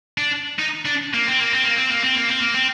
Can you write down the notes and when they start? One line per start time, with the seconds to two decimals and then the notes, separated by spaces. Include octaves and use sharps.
0.18 D4
0.59 D#4
0.86 D4
1.14 A#3
1.27 C4
1.40 A#3
1.52 C4
1.64 A#3
1.77 C4
1.90 A#3
2.03 C4
2.16 A#3
2.27 C4
2.40 A#3
2.54 C4